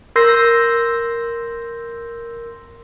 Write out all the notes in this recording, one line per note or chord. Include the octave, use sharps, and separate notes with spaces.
A#4 C6 E6 G6 A#6 C7